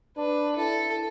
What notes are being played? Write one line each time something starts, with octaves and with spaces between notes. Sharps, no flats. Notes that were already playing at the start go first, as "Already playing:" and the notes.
D4 B4
E4 A4